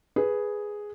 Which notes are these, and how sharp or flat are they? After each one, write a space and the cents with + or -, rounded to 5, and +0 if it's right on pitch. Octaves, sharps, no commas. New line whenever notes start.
G#4 +0 B4 +0